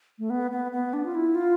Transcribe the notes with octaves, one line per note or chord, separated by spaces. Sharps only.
A3
B3
B3
B3
D4
F4
E4
F4